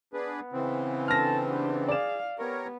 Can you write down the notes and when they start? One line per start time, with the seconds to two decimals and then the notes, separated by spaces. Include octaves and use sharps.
0.14 B3 D4 G#4 B4
0.53 C#3 E3 C4
1.08 D4 A4 A5 F6 A#6
1.48 B3 D4 G4
1.89 G#4 D5 F5 E7
2.39 B3 G4 A#4 C#5